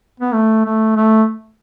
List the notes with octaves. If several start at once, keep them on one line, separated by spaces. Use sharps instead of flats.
B3
A3
A3
A3